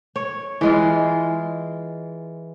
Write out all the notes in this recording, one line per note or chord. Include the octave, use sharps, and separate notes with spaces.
C#5
E3 G#3 F4